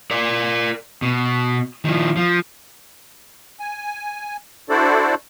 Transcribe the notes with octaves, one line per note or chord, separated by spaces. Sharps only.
A#4 D5
B2
D#3 F3
F3
G#5
D4 E4 F#4 A4 C5 D5